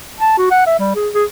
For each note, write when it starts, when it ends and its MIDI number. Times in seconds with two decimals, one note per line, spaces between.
0.20 0.33 81
0.38 0.49 66
0.51 0.65 78
0.67 0.78 76
0.79 0.94 55
0.96 1.09 68
1.14 1.24 68